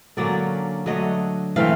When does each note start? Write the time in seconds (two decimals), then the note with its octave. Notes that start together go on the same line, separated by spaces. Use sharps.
0.17 D3 F#3 A#3 C#4 D5
0.86 D3 F#3 A3 D#5
1.56 E3 A3 C4 F5